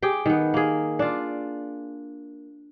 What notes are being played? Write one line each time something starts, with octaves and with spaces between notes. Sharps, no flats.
G4 G#4 G5
D#3 B3
A#3 G#4
D4 F4